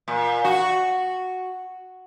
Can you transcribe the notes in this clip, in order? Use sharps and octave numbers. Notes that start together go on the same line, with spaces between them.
A#2
F#4